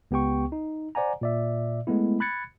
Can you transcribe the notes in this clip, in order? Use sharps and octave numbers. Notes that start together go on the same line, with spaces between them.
C#2 B3 G4 G5 C#6
D#4
C5 D5 F#5 G#5 A#5
A#2 D5 E5
G#3 A3 B3 E4
B5 F#6 G#6 A6 C#7